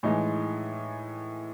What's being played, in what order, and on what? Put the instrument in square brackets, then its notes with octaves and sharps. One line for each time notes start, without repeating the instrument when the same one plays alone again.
[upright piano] A2 E3 G#3 D#4